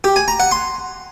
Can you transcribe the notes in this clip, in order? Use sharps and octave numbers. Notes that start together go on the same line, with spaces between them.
G4
G#5
A#5
F#5
C6